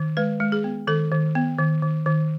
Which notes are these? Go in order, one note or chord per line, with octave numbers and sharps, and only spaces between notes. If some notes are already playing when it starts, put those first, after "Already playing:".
Already playing: D#3
G#3 B4
G#3
G#4
B3
D#3 A4
D#3
B3
D#3
D#3
D#3